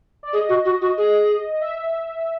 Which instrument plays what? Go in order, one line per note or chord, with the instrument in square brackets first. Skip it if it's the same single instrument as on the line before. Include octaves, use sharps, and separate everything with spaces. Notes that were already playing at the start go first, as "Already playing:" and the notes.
[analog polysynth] D5
[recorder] G#4 [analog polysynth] D#5
[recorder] F#4
F#4
F#4
G#4
[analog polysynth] D#5
E5